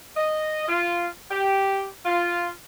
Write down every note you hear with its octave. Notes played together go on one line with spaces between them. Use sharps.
D#5
F4
G4
F4